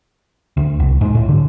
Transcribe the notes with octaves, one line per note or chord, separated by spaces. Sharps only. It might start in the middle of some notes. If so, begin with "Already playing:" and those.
D2
C2
G#2
A2
D3